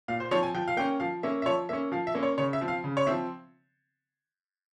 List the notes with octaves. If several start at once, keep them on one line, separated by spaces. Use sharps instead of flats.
A#2 F5
C5
F3 C4 C#5
G#5
F3 G5
F5
A#3 C#4 G5
F3 F5
A#3 C#4 E5
E5
F3 C#5
A#3 C#4 E5
F3 F5
E5
A#3 C#4
C#5
C#3 C#5
E5
F3 C4
F5
C#3
C#5
F3 C4 E5